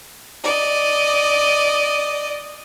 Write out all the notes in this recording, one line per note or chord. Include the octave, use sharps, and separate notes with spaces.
D5 D#5